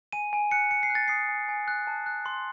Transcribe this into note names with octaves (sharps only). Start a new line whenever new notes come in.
G#5 D#7
G#5
F#6 C#7
G#5 C#7
C7
F#6
A6
D#6 C7
G#5
G#5
F#6
A5
F#6
C6